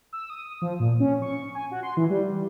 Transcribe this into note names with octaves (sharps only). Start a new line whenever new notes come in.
E6
D#6
F3
A#2
C#4
C#6
G#5
F#4
C6
E3
G3